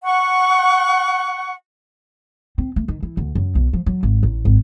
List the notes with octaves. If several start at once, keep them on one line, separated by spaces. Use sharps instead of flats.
F#5 C#6
C4
A3
D#3
E3
D2
F#2
B1
F3
F#3
G#1
A1
G#1